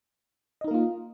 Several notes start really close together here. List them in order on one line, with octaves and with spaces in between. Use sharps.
D#5 D#4 A#4 A#3 F4